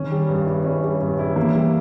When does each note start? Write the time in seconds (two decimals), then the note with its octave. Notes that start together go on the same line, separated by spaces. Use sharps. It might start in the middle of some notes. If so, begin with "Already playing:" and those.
Already playing: D#3 C#4
0.11 G3
0.29 G2
0.47 E4
0.64 C#4
0.83 G3
1.01 G2
1.19 E4
1.30 D#3
1.36 E3 A#3
1.54 G3